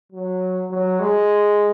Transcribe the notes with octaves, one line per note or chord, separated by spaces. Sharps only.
F#3
F#3
G#3